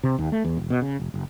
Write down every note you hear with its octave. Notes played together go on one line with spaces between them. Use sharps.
C3
D#2
A3
E2
E1
B2
C#3
F1
F#1